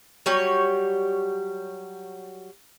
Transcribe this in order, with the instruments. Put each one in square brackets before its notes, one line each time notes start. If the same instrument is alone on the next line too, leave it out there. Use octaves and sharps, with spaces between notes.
[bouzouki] F#3 G3 C#5